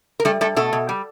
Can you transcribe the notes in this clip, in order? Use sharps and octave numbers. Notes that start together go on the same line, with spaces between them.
A#4
G3 A3 A4
G3 A3 A4
B2 A3 A4
B2
G3